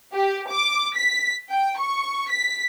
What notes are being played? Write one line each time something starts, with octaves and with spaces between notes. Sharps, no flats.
G4
D6
B6
G5
C#6
B6